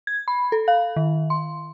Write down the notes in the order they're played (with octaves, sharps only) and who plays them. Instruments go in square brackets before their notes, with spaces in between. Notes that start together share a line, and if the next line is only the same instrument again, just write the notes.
[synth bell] G#6
B5
A4
F5
D#3
C6